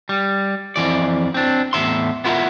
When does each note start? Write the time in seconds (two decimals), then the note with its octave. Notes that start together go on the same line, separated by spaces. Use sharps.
0.09 G3
0.76 F2 E3 D5
1.34 C4 D4
1.73 E2 A2 C#3 E5 C6
2.24 B3 E4 F4 G#4 A#4 E5